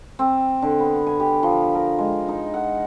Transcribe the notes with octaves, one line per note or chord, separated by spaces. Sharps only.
C4
D3
B3
G#5
G4
F3
A#4
G#3
D#4
F#5